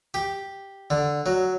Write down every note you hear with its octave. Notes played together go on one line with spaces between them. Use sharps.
G4
D3
F#3